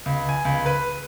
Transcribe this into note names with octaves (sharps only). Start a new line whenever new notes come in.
C#2
G#5
C#2
B4